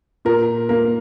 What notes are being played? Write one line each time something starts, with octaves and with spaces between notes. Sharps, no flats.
A#2 A#4
A#3 A#4